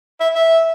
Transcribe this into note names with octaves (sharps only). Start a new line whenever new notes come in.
E5
E5